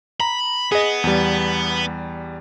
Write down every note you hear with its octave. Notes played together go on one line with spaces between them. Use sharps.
A#5 B5
B3 G#4 D#5
E2 G3